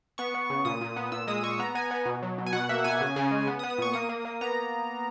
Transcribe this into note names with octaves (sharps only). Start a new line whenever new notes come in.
B3 C#6
B3
C#3
A#2 D#6
A#2
B3
A#2 E6
G#3 D#6
G#3 C#6
B3 A#5
B3 G#5
B3
B2
F#3
B2
G#5
B2 F#5
A#3 E5
B2 G#5
C#3
C#3
G#3
B3
D#6
B3
D#6
A#2 C#6
A#3 D#6
A#3
A#3
B3 A#5